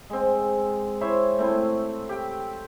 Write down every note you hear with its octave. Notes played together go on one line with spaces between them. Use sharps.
G#3 C4
E4 C5 C#5 E5
A3 C4 E4
G4 G5